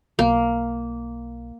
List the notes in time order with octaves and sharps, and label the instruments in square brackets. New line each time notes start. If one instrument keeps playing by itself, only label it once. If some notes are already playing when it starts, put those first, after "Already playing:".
[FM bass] B1 [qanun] A#3